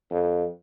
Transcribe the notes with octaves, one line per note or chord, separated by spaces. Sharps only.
F2